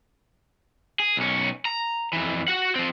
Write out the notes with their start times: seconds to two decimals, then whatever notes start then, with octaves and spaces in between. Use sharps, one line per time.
1.00 G#4
1.17 B1 C#4
1.65 A#5
2.13 F2 E3
2.48 F#4 F#5
2.76 F3 C4